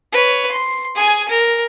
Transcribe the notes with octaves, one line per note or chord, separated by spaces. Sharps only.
B4 C#5
C6
G#4 G#5
A#4